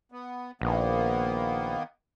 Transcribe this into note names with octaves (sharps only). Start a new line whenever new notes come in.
B3
A#1 D#3 A#3 B3